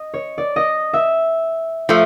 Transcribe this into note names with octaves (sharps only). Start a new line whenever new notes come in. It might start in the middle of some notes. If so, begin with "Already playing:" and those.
Already playing: D#5
C#5
D5
D#5
E5
F3 A3